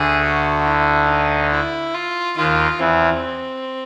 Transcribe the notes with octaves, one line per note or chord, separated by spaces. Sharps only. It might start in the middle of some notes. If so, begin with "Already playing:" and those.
Already playing: D2 D3 G#4
F#4
E4
D#4
E4
F4
D#2 D#3 F4
E2 E3 C4